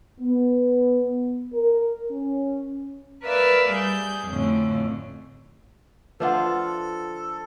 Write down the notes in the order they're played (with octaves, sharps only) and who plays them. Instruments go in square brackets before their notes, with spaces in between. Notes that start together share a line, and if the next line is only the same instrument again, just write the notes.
[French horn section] B3
A#4
C#4
[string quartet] A#4 B4 D5 E5 F5
G3 G#4 G6
F2 A2 D3 C4 C#4
[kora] F3 D4 F4 [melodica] A4 [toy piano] B4 E5 F#5